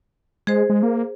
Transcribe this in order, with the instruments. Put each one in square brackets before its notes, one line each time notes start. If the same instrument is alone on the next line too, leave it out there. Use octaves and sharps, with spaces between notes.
[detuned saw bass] G#3 [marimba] G#4 C5
[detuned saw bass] G#3
A#3